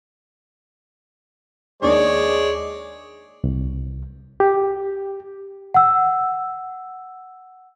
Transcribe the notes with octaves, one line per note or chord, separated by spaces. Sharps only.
D#2 G#3 D4 C#5 D5
C2
G4
F#5 E6